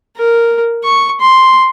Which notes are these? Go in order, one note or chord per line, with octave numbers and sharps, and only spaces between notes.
A#4
C#6
C6